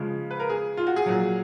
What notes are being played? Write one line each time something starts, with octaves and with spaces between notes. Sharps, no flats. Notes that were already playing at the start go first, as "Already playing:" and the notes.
Already playing: C#3 F3 G#3
B4
A#4
G#4
F4
F#4
G#4
A#2 F#3